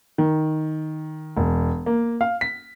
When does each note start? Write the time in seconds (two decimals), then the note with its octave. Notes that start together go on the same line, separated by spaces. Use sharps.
0.18 D#3
1.37 E1
1.86 A#3
2.21 F5
2.41 B6